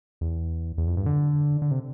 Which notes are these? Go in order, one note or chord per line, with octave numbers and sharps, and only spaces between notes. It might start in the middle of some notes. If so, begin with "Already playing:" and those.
E2
E2
F2
G2
D3
D3
C3